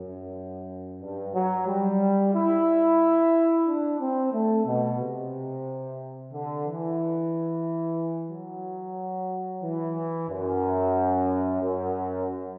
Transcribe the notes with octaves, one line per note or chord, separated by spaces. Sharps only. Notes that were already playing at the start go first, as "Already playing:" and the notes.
Already playing: F#2
G2
F#3
G3
E4
D4
C4
A3
B2
C3
D3
E3
F#3
E3
F#2
F#2